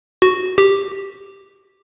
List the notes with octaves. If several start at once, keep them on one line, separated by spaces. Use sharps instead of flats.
F#4
G4